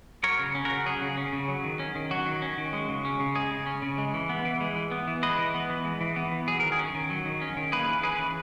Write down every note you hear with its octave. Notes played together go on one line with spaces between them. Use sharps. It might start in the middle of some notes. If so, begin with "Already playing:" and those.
F#3 A#4 C#5
C#3
C#4
C#3 F#4 A#4
F#3 G#4
C#3
C#4
C#3
F#3
D#3
C#4
D#3
F#3 F#4
D#3
C#4
D#3
G#3
C#3
C#4
C#3
G#3 G#4
C#3
C#4
C#3
G#3
E3
B3
E3
G#3
E3
B3
E3
G#3 B4 D#5
E3
B3
E3
G#3
E3
B3
E3
F#3 G#4
D#3 A#4
G#4
C#4
D#3
F#3
D#3
C#4
D#3
A#3 G#4 B4
E3
C#4 G#4 B4
E3